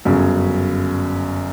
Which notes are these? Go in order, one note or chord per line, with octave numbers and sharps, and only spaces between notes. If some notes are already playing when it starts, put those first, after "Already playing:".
G1 F#2 C#3